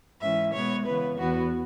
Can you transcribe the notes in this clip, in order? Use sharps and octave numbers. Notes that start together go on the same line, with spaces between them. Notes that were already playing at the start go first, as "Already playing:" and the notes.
G#2 E3 C#4 E5
B2 G#3 B3 C#5
C#3 E3 B3 B4
E2 E3 B3 F#4